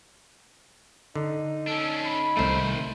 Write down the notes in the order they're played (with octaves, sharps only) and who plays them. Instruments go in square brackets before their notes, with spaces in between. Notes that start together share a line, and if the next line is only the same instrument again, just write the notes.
[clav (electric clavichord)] D3 [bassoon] D#4
[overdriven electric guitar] C#4 D4 [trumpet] A4
[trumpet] B5
[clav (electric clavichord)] C2 A3 [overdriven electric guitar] D#3 C5